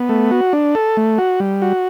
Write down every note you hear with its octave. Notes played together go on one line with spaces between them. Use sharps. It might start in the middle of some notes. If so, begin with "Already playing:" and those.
Already playing: B3
A3
F#4
D4
A4
A3
F#4
G3
F#4